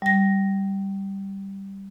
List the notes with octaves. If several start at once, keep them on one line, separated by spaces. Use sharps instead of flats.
G3 A#6